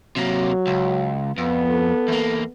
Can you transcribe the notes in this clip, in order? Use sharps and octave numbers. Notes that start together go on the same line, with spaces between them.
C3 F#3 A#3
C#2
F2 B3
A4
E2 A#3